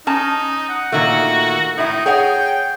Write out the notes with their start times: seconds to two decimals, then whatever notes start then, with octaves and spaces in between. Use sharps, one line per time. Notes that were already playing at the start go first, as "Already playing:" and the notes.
0.07 C#4 D#4 A5
0.69 F#5
0.92 A#2 D#3 A3 F#4
1.78 A2 D#4 E4
2.06 G#4 C#5 F#5 G5